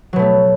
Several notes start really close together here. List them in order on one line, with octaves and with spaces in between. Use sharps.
F#3 B2 A3 B3